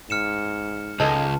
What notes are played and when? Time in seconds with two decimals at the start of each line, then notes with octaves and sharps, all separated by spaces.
0.10 G#2 F6 C#7 E7
1.00 C#2 G#3 D#4 A4 A5